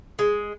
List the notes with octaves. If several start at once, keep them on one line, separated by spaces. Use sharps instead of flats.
G#3